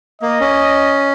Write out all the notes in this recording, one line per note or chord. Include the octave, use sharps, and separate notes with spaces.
A#3 D#5
C#4